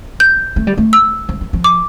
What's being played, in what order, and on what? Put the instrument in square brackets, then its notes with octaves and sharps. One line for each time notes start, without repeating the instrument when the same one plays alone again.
[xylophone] G6
[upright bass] A3
G3
A3
[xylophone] E6
[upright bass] F3
F3
F3
[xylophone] D6